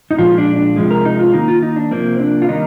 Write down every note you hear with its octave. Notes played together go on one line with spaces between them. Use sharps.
D#4
A#2 F3 G#3 F4
D4
D4
C3 F3 G#3
A#4
D#4
F4
D#3 A#3 D#4
F4
D#4
D4
C3 F3 A#3 C4
D4
F4
D#3 G3 A#3 D#4